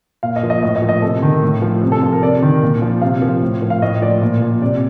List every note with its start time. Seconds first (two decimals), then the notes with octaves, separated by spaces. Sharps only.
0.23 A#2 F5
0.36 D#5
0.43 F3
0.50 D#5
0.63 A2 D#5
0.76 D#5
0.82 F3
0.89 D#5
1.02 C3 A4
1.22 D#3
1.42 A2
1.62 F3
1.82 C3
1.92 A4
2.02 F3 A4
2.13 A#4
2.22 C3 D5
2.42 D#3
2.63 A#2
2.82 F3
3.01 C3 F5
3.22 F3
3.42 A2
3.62 F3
3.70 F5
3.82 A2 D#5
4.02 F3 D5
4.21 A#2
4.42 F3
4.61 C3 D5